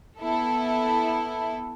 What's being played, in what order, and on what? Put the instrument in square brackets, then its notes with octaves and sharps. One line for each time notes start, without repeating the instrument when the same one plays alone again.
[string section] B3 E4 A4